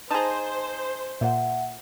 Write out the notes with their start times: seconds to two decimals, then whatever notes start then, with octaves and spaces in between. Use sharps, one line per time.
0.10 D#4 G#4 C5 A5 A#5
1.21 A#2 E5 F#5